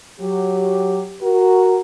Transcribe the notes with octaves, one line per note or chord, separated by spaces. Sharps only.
F#3 G4
F#4 A#4